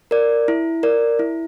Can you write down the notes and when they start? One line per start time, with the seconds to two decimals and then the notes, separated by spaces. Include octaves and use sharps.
0.11 A#4 D5
0.48 E4
0.83 A#4 D5
1.19 E4